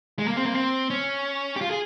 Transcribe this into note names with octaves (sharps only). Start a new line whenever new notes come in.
G#3
A#3
C4
A#3
C4
C#4
G4
F4
G#4